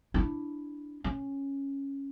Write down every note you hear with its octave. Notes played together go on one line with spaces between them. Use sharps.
D4 E4
C#4